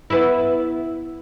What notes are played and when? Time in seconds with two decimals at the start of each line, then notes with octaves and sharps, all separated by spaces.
0.10 B3 E4